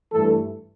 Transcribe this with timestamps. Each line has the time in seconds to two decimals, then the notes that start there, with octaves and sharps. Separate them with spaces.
0.12 G2 E3 A3 A4